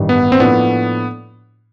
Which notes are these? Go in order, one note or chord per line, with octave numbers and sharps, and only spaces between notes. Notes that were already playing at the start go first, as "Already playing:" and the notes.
Already playing: A1 G2 D#3 G3
B3
C4
A2 F3 A#3 B3 D4 F4